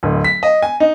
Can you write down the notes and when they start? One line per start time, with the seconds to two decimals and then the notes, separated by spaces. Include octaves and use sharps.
0.03 D1
0.24 B6
0.43 D#5
0.62 G#5
0.80 D#4